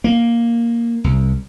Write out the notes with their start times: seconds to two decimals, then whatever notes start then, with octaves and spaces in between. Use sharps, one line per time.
0.04 A#3
1.04 C2